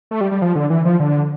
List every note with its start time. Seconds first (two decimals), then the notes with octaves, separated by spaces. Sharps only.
0.11 A3
0.21 G3
0.31 G3
0.42 F3
0.55 D3
0.70 E3
0.85 F3
1.00 D3